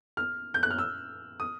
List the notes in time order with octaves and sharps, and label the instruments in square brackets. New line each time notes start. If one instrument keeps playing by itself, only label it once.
[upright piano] F6
G6
F#6
F6
E6
D#6